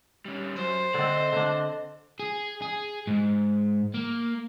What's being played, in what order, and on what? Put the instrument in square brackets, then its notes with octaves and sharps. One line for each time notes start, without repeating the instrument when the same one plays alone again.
[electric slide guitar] G3 C#4
[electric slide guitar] F#2 [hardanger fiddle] C5
[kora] D3 C4 [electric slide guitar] D5 D#5
[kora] D3 D4
[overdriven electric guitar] G#4
G#4
G#2
A#3